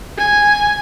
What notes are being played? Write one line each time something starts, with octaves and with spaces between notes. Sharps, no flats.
G#5